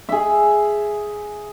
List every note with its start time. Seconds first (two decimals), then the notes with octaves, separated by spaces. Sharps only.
0.09 G#4 E5